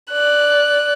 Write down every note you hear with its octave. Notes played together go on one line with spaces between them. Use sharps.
D5 F#6